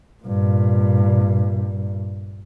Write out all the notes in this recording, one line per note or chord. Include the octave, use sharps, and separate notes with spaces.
G2 A#2